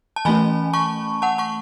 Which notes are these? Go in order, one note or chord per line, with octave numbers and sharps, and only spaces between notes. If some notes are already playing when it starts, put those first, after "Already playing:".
A5
E3 A3 C#4 G#5 B5
A5 C#6
F#5 A5
A5 C#6